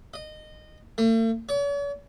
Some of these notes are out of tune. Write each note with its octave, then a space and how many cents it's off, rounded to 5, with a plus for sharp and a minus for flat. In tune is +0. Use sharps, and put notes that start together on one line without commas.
D#5 -20
A3 +45
C#5 +45